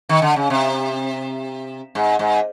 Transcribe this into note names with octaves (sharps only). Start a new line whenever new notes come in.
D#3
D3
C#3
C3
G#2
G#2